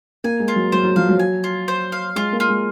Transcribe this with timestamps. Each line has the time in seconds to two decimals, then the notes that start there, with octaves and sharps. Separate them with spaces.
0.24 A#3 G#5
0.40 G#3
0.48 F4
0.56 F#3
0.72 F#3 C5
0.83 F#3
0.96 F3 F5
1.09 F#3
1.19 G#5
1.44 F4
1.68 C5
1.92 F5
2.16 G#3 F4
2.33 A#3
2.40 F4
2.49 G#3